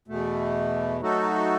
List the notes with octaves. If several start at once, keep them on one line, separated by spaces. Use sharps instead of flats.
E2 B2 A3
F#3 A3 D#4 F#4 A4